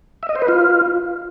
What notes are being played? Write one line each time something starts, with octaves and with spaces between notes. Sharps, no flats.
E5
D#5
C5
B4
F4